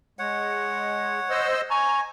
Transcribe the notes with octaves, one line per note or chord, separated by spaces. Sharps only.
G#3 C#5 F#5
C5 D#5 E6
G#5 A#5 C#6